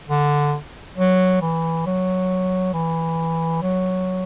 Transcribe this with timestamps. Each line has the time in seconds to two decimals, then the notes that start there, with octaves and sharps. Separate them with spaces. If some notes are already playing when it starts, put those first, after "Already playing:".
0.09 D3
0.97 F#3
1.42 E3
1.86 F#3
2.74 E3
3.62 F#3